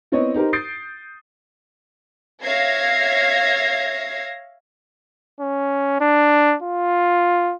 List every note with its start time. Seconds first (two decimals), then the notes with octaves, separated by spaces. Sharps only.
0.12 B3 C4 E4 B4 C#5 D#5
0.34 D#4 G4 A#4 C5
0.53 D#6 G6 A6 C7 D7
2.44 C#5 E5 F5 G#6 A#6 C7
5.40 C#4
6.01 D4
6.62 F4